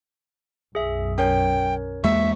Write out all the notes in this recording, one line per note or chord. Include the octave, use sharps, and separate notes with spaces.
B1 F#2 G#4 E5
C#4 A#4 C#5 G5
E2 G#3 A#3 E5 C#6